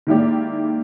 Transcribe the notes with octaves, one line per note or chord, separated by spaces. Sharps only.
D#3 G#3 A#3 E4 G4 D5